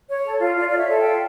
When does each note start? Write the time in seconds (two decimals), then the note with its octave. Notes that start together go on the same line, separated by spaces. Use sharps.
0.08 C#5
0.25 A4
0.40 F4
0.56 F4 D5
0.68 C#5 D5
0.78 E5
0.89 A4
1.00 F4 G5